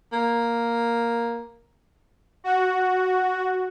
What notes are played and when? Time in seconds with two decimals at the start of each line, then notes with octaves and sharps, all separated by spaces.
0.12 A#3
2.44 F#4